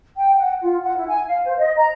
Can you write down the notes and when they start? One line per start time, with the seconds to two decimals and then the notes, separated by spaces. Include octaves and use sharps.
0.17 G5
0.36 F#5
0.62 F4
0.82 F#5
0.96 E4
1.08 G#5
1.28 F5
1.45 C5
1.57 D#5
1.76 A#5